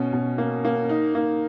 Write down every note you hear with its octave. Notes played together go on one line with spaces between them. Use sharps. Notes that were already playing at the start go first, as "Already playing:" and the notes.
Already playing: B2 C#4
B2
A#3
A#3
D#4
A#3